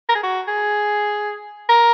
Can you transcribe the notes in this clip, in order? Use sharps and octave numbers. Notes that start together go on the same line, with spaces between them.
A#4
G#4
F#4
G#4
A#4